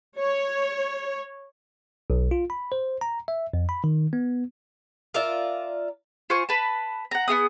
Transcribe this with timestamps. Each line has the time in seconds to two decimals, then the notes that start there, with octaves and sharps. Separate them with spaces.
0.18 C#5
2.10 B1
2.31 F4
2.50 B5
2.72 C5
3.01 A#5
3.28 E5
3.54 F2
3.69 B5
3.84 D#3
4.13 B3
5.14 F4 A#4 D5 E5
6.30 F4 C5 G#5 C#6
6.49 B4 A5
7.11 F#5 A#5
7.28 B3 D#4 G#4 D#6